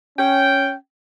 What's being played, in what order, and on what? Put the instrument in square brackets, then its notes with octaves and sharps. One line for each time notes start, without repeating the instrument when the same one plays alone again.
[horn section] C#4 G5